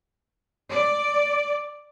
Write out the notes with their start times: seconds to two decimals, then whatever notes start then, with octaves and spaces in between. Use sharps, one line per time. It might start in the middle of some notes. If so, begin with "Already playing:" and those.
0.72 D5